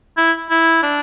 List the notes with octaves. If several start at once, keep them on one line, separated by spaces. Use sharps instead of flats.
E4
E4
D4